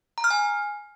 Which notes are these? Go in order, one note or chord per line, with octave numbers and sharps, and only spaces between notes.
A#5
F6
G#5